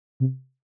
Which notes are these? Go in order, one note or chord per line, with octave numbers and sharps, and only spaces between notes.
C3